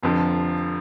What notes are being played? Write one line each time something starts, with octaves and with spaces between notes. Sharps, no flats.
F1 F2 D3 F3